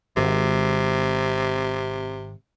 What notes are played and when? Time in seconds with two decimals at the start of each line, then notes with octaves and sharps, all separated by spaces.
0.17 G#1 C3